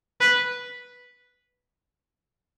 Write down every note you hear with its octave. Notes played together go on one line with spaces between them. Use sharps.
B4